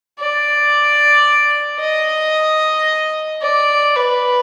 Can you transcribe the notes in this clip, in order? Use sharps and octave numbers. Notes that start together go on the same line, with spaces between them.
D5
D#5
D5
B4